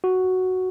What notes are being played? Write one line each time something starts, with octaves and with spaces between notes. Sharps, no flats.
F#4